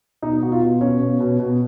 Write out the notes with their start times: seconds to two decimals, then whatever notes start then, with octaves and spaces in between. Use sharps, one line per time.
0.22 B2 D#4
0.42 B2 F#4
0.52 F4
0.62 B2
0.81 B2 C#4
1.01 B2
1.20 B2
1.39 B2